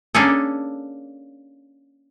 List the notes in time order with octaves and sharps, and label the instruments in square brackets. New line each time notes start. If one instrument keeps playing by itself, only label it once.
[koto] A#3 C#4 D4 G#4 A4